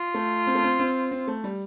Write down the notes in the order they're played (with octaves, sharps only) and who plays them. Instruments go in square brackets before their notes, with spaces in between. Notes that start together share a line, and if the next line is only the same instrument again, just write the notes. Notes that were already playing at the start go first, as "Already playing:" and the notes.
Already playing: [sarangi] F4
[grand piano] A3
C4
A3
C4
C4
C4
A3
G3